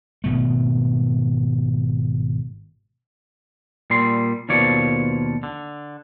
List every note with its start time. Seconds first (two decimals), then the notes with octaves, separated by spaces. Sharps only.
0.24 G#1 B2 A3
3.90 A#2 G3 C6
4.49 D#2 B2 F3 C#5 D5
5.43 D3